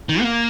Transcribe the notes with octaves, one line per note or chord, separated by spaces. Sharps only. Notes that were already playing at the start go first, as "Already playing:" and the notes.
D#3
B3
A#3